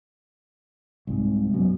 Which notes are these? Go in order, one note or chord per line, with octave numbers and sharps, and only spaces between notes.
C2 G#2
F#2 B2